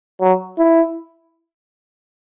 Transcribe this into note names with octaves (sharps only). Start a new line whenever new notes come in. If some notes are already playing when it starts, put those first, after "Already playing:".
F#3
E4